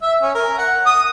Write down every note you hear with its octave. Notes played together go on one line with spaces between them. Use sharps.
E5
C#4
A#4
F#5
D#6